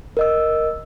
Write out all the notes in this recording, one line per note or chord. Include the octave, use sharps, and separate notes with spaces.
A#4 D#5 E6